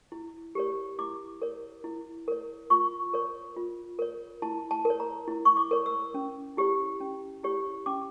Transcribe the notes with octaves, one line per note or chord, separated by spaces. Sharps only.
E4
G4 A#4 C#5
E4 D6
A#4 C#5
E4
A#4 C#5
F4 C#6
A#4 C#5
F4
A#4 C#5
E4 A5
A5
A#4
C#5
A#5
E4
C#6
D6
A#4 C#5
E6
C#4
E4 G4 C#5
C#4
E4 G4 C#5
C#4 D6